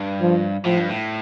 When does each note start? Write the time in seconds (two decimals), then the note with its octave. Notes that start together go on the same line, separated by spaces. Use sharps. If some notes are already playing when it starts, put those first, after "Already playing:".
Already playing: G2
0.21 F3
0.65 A2 F3
0.77 G2
0.89 A2